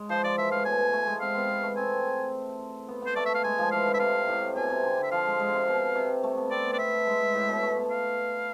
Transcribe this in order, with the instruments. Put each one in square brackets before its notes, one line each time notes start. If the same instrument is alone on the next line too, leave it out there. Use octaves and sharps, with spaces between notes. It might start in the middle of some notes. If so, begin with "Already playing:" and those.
Already playing: [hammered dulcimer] G#3
[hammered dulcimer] F3 [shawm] C5
[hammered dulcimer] F3 [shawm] D5
[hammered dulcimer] E3 [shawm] E5
[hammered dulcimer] A2 [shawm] F5
[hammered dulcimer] B2 [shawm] G#5
[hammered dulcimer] B2
A3
G#3
[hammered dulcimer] C4 [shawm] F5
[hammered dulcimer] B3
B3
A3
[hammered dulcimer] C4 [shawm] G#5
[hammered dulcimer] B3
[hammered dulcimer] B3 [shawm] C5
[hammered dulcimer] A3 [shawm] D5
[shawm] E5
F5
[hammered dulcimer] G#3 [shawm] G#5
[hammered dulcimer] F3
[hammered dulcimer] E3 [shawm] F5
[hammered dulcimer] D3
[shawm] E5
[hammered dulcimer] C3 [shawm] F5
[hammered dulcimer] A2
[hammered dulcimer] B2 [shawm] G#5
[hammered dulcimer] C3
D3
D3
[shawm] E5
[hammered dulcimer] F3 [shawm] F5
[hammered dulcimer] G#3
G#3
D3
C3
B2
C3
A3
B3
[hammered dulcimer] C4 [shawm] D5
[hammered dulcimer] B3
[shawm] D5
[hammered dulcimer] B3 [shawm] E5
[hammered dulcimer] G#3
A2
B2
A3
B3
[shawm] F5